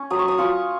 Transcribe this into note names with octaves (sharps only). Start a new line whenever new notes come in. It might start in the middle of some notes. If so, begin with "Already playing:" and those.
Already playing: C#4
F#3 D#6
C#6
D#6
C#4 F4 C#6